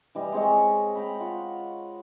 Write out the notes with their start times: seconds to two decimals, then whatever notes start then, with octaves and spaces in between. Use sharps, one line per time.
0.15 E3 G3 D#5
0.32 G#3 C4 C#5 D#5
0.95 G5 A#5 B5
1.20 F4 F#5